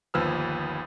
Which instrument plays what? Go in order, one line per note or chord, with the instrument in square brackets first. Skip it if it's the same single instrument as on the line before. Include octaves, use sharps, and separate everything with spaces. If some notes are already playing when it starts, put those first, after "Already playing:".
[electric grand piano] G1 D#2 F3 B4 E6 F6